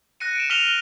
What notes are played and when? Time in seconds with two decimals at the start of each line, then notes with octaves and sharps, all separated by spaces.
0.20 F#6 A#6 C#7 D#7
0.35 D7 E7
0.50 F6 B6 D#7 F7 G7